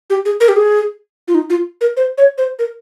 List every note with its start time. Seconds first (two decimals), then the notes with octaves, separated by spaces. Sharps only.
0.10 G4
0.25 G#4
0.40 A#4
0.49 G4
0.56 G#4
1.28 F4
1.35 D#4
1.50 F4
1.81 A#4
1.97 C5
2.18 C#5
2.38 C5
2.59 A#4